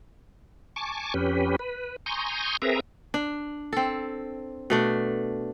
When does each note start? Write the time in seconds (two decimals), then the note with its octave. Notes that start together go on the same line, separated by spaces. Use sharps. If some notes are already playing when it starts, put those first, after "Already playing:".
0.76 G#5 A5 C#6 D6
1.14 F2 C#4 G4 B4
1.59 B4
2.06 G#5 A#5 C6 C#6 D#6 G6
2.62 C4 G#4 A#4 B4 E5 A#5
3.14 D4
3.73 C4 A4
4.70 B2 A3 D4